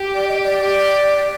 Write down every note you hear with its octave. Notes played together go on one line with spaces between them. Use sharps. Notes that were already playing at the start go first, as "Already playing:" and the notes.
Already playing: G4
D5
D#5
D5
G4